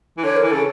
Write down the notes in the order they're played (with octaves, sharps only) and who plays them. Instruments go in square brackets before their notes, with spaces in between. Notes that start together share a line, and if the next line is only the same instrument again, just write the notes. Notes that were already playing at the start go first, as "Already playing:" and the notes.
[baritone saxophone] E3
[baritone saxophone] D3 [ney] C#5
[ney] A#4
[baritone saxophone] E3
[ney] A4
[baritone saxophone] C#3